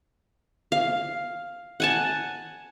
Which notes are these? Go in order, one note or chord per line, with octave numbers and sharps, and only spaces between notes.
F5
F#5 G#5 A5